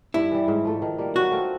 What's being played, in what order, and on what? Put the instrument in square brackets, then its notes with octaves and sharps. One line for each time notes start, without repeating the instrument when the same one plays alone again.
[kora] G2 [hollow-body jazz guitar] E4
[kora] E3 G3
G#2
F3 A3
D#3
G3 A#3
[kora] F#3 [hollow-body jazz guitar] F#4
[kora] A3 C4 F4